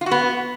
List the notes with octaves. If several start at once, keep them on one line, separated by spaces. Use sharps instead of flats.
F4
F#4
B3